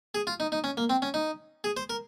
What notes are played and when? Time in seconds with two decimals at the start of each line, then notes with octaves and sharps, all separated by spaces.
0.15 G#4
0.27 F4
0.40 D#4
0.52 D#4
0.64 C#4
0.77 A#3
0.90 C4
1.02 C#4
1.14 D#4
1.64 G#4
1.77 C5
1.90 A#4